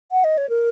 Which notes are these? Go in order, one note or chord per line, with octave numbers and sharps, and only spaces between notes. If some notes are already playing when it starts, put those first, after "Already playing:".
F#5
D#5
C#5
A#4